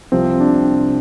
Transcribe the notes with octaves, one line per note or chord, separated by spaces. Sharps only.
C2 C3 F3 C4
D4